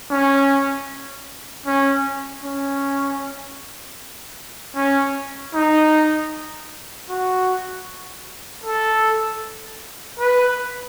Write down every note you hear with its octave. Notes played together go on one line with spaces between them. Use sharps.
C#4
C#4
C#4
C#4
D#4
F#4
A4
B4